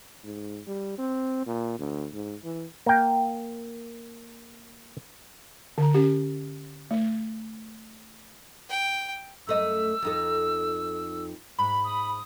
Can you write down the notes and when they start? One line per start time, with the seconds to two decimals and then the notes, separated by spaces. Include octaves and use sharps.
0.24 G#2
0.68 G3
0.98 C4
1.47 A#2
1.79 D2
2.14 G#2
2.44 E3
2.86 A#3 G5
5.78 D3 A#5
5.94 C#4 G4
6.91 A3
8.69 G5
9.47 F#2 A3 D#5 E6
10.02 F2 D#4 A4
11.59 G#2 B5
11.84 D#6